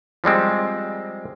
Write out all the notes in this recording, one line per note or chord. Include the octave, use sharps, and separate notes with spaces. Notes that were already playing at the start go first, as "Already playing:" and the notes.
F3 G3 G#3 C4